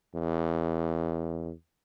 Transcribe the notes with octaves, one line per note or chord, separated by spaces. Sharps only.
E2